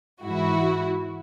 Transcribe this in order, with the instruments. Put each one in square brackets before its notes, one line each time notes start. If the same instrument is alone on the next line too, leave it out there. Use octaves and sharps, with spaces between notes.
[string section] G#2 E3 E4 F#4